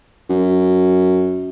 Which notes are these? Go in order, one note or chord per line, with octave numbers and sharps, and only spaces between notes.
F#2